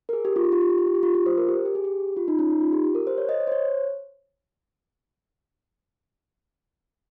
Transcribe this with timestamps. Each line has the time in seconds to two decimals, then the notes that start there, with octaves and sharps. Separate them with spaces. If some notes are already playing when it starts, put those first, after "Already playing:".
0.09 A#4
0.13 G#4
0.25 G4
0.36 F4
0.44 G4
0.52 F4
0.61 G4
0.70 F4
0.78 G4
0.87 F4
0.94 G4
1.03 F4
1.15 F4
1.26 C5
1.38 A#4
1.48 G4
1.65 G4
1.75 G#4
1.84 G4
2.17 F4
2.28 D#4
2.39 C#4
2.50 D#4
2.61 F4
2.73 G4
2.84 G4
2.95 A#4
3.07 C5
3.18 C#5
3.29 D#5
3.40 C#5
3.47 C5
3.52 C#5